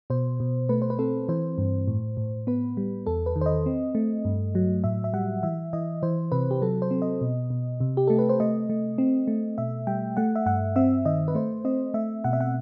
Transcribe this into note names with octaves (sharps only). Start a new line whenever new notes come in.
B2 C5
B2
A3 B4
C5
B4
C4 A4
E3 C5
G2
A2
A2
B3 B4
G3
E2 A4
B4
D#3
C5
D#5
C4
A3
G2
F#3
A2 E5
E5
G3 F#5
E3 E5
E3 D#5
E3 C5
C3 B4
G4
F#3 A4
C5
C4
D#5
B2
B2
C3
G4
A3 A4
B4
C5
A3 D#5
A3
C4
A3
B2 E5
G3 G5
A3 F#5
E5
G2 F#5
C4 E5
D#3 D#5
B4
A3 C5
C4 D#5
A3 E5
B2 F#5
E5
F#5